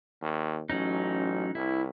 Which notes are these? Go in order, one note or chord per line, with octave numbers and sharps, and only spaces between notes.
D#2
A1 F#3 C#4 D#4
C2 E4